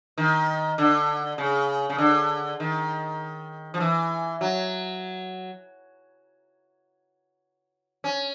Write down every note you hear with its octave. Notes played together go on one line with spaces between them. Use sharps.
D#3
D3
C#3
C#3
D3
D#3
F3
E3
F#3
C#4